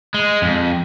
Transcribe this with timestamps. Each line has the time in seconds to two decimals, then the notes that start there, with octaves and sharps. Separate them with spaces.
0.14 G#3
0.42 F2